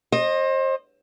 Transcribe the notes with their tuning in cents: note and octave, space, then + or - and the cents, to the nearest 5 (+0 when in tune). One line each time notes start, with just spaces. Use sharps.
C5 +30 D#5 -10